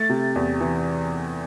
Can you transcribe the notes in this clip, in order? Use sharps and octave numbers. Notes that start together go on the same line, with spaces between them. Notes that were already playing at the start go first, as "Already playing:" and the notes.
Already playing: A3 A6
C3
E2
E3